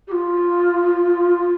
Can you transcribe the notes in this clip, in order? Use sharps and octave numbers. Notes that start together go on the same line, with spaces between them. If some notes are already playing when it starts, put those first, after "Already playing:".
G4
F4